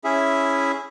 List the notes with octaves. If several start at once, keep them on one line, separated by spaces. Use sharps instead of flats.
C#4 E4 G#4 E5